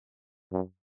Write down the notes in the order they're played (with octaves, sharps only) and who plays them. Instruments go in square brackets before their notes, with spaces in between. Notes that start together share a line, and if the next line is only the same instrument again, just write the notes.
[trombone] F#2